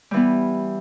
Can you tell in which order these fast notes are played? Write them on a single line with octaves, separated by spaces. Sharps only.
G3 E3 B3